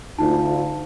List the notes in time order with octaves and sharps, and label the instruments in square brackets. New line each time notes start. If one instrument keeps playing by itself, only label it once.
[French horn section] D2 F4 [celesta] D#4 A5